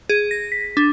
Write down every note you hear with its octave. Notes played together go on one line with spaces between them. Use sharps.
G#4
A#6
B6
D4